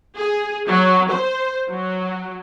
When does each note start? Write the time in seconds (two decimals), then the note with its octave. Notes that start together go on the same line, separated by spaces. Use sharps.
0.17 G#4
0.67 F#3
1.11 C5
1.70 F#3